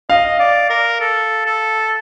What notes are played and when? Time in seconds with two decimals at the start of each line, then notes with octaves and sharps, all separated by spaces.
0.10 D#5 F5
0.40 D5
0.70 A#4
1.01 A4
1.46 A4